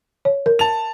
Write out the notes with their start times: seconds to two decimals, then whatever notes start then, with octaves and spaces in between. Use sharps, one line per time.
0.25 C#5
0.46 A#4
0.59 A5 F7